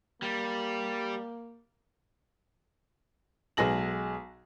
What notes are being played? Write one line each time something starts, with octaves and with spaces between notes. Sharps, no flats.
G3 A#3
B1 G#3 G#4 A#6 F#7